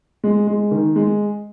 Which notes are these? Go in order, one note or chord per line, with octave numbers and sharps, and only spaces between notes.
G#3
G#3
D#3
G#3